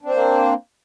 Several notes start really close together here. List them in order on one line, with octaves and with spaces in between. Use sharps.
D4 C4 C5 A#3